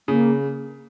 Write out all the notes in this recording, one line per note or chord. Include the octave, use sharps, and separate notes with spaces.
C#3 A#3